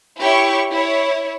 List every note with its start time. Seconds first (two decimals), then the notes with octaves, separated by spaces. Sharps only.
0.19 E4 G4 C#5 C#6
0.71 E4 C#5